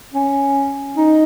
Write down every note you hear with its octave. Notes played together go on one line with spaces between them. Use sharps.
C#4
D#4